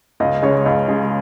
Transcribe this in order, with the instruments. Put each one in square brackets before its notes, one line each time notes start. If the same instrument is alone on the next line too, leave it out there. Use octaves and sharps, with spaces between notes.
[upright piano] C#2 D#5
C#3 G#3 C#5
C#2 D#5
C#3 G#3